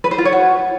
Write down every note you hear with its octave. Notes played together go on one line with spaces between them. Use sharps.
B4
C5
F4
C#5
F#4